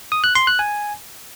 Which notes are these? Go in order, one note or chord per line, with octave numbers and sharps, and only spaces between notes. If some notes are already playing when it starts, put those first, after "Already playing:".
D#6
F#6
C6
F#6
G#5